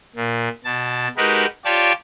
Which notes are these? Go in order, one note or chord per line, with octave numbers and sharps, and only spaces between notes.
A#2
B2 A5
G#3 D#4 F#4 G4 A#4 B4
F4 G4 C#5 D5 A5 D6